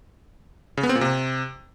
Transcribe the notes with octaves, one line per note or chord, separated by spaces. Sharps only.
C#3
B3
C4
A#2
C3